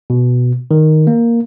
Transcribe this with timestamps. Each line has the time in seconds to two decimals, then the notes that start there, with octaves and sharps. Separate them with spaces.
0.10 B2
0.71 D#3
1.07 A#3